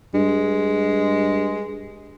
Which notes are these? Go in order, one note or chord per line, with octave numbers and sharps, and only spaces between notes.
G2 G#3